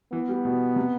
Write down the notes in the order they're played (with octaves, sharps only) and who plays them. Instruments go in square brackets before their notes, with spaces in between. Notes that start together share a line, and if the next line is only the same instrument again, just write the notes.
[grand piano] E3 [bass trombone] B3
[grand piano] G3
B2
C3